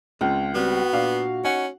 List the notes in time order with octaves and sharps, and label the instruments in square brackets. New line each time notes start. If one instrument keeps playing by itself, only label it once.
[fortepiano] C#2 [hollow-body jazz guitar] G#3 C4 F4
[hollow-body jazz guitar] G3 C4 [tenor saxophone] B3 [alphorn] F#4
[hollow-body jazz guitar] A#2 D4 [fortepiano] F5
[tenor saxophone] C#4 [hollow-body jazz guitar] D#4 [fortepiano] F#5